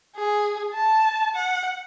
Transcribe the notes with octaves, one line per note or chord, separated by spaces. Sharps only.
G#4
A5
F#5